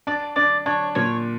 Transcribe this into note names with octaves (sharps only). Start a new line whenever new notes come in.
D4 D5
D4 D5
D4 C#5
A#2 C#5